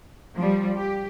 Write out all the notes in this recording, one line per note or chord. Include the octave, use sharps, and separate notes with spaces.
F3 G3
G4